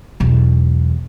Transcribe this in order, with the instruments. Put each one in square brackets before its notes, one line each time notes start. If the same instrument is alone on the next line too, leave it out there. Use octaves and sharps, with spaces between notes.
[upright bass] B1 E2